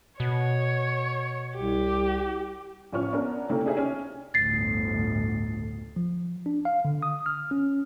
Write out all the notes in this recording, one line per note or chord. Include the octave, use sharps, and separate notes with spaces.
B2 C#5
C2 G4
A1 F3 C#4 C#6 F6
B3 C#4 D4 A#4
C3 D#3 A3 A#3 C#4 E4
D4 D#4 G4 G#4 C5 E5
C#4 G#5 F6
G1 D2 A2 A6 C7
F3
D4
F5
D3
D#6
F6
C#4